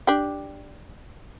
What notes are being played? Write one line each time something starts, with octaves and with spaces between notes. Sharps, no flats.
D4 G4